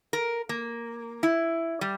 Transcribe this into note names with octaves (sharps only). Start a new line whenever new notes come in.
A#4
A#3
E4
G3